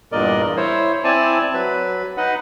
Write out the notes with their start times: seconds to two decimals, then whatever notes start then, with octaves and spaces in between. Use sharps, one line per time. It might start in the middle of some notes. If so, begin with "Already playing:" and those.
0.12 E2 G2 A#2 A#4 D5 D#5
0.57 E4 C5 C#5
1.04 C4 E4 D5 G#5 A5
1.54 F#3 B4
2.17 D#4 B4 D#5 F#5